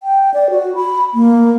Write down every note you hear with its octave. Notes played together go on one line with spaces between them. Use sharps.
G5
D5
F#4
B5
A#3